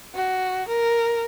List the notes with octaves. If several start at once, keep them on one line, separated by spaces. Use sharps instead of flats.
F#4
A#4